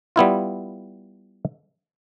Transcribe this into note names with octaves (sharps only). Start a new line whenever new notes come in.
G3 B3 E4 F4